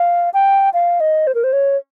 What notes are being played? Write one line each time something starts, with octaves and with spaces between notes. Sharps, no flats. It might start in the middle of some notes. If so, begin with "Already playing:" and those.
Already playing: F5
G5
F5
D#5
C5
A#4
C5
C#5